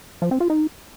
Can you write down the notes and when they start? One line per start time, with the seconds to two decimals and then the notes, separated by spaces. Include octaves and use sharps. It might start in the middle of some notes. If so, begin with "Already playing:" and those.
0.22 F3
0.31 C4
0.40 F4
0.50 D#4